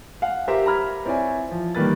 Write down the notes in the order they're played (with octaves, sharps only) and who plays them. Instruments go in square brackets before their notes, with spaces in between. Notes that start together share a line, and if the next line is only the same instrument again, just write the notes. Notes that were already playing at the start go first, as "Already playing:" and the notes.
[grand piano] F5 F#5
G4 A#4 C5 E5 A#5
A#5 B5 F6 G#6
C4 E4 C#5 D5 G#5
F3
D#3 G3 A#3 B4 A6